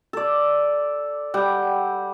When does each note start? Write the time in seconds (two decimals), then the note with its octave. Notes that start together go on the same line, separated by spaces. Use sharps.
0.13 A4 D5
1.34 G3 F#5 G5